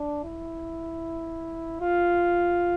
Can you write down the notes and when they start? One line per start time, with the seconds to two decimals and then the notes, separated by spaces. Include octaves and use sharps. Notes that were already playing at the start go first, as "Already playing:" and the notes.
Already playing: D4
0.24 E4
1.81 F4